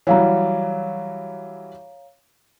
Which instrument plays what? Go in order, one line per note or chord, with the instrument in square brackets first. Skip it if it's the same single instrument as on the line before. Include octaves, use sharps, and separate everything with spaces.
[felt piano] E3 F#3 G3 [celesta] C#5 F5 A#5